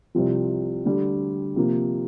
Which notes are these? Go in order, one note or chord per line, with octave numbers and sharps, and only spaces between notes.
C2 C3 F3
D2 D3 G3
C3 F3 A#3